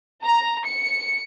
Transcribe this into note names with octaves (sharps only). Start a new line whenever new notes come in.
A#5
C#7